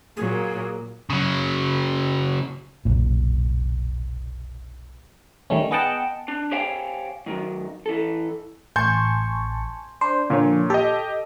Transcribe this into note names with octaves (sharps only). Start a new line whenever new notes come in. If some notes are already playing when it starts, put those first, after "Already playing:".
A#2 F#3 A#3 G#4
C#3 F#3
F1 B1 A#2
D#3 G3 A3 C#4
B3 G#4 D#5 F#5 G5 A5
D4
G4 C5 C#5 F5 G5 G#5
F#2 D#3 E3 F#3
E3 A4
A1 G#5 A5 C6 C#6 G6
D4 C5
A#2 D3 F3 C#5
G4 A4 D#5